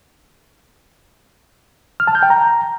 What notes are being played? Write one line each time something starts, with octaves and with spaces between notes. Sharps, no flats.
F6
A5
G6
G5
A#5